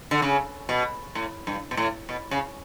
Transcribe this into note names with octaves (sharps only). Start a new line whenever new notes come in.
D3
C#3
B2
A2
G2
B2
A2
B2
C#3